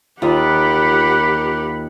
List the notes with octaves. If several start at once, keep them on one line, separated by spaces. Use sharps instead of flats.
D#2 F4 G4 A#4 F#5 B5